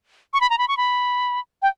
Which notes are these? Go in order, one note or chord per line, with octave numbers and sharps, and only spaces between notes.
C#6
B5
A#5
B5
C#6
B5
G5